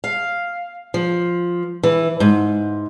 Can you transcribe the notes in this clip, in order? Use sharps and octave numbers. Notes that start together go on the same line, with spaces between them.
F5
F3
E3
G#2